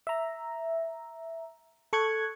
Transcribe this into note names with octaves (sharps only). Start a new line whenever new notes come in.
E5 A#5
A4 C#6 F#6 G#6